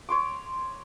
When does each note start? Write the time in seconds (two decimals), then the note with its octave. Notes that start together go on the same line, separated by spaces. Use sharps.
0.09 C#5 C6 D6